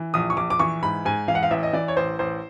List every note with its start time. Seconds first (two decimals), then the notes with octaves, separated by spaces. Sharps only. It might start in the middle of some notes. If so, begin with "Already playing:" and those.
Already playing: E3
0.14 A#1 D#6
0.30 C#6
0.37 A#1 D6
0.50 D6
0.59 E3 C#6
0.83 G#2 B5
1.05 G#2 G#5
1.28 E3 F5
1.35 F#5
1.43 F5
1.51 A1 E5
1.63 D#5
1.73 E3 D5
1.88 C#5
1.97 A1 C5
2.19 A1 C5